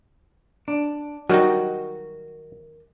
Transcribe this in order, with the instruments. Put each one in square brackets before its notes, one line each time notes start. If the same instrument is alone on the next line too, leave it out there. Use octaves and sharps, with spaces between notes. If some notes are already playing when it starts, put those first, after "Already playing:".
[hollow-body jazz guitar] D4
[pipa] D#3 [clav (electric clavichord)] F#3 G3 D#4 [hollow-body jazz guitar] F#4